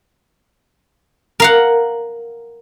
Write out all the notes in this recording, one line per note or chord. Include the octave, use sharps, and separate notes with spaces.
A#4 F5 F#5